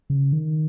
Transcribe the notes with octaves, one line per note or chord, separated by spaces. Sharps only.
C#3
D#3